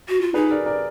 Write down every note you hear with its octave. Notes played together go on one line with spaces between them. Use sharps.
F#4
F4
D#4 G#4 B4
A#4 D5
A#4 D5